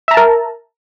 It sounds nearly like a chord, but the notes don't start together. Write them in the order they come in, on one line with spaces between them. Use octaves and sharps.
E5 A#5 A5 A#4